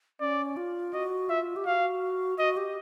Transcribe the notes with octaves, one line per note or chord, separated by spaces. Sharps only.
C#4 D5
F4
F#4 D#5
F4 E5
G4
F#4 F5
F#4 D#5
G4